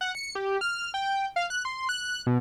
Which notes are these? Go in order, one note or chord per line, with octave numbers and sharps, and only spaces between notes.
F#5
C#7
G4
F6
G5
F5
F#6
C6
F#6
B2